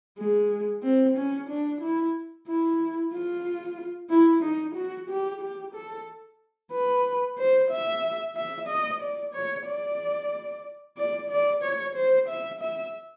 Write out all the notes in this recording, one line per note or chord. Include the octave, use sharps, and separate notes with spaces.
G#3
C4
C#4
D4
E4
E4
F4
E4
D#4
F#4
G4
G4
A4
B4
C5
E5
E5
D#5
D5
C#5
D5
D5
D5
C#5
C5
E5
E5